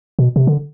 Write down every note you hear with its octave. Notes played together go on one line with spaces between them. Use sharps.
B2
C3
D3